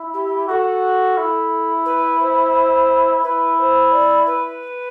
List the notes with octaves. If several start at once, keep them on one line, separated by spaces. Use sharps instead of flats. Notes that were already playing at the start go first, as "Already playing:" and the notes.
Already playing: E4
G4
F#4 A4
E4
B4
C5
E4 B4
C5
D5
B4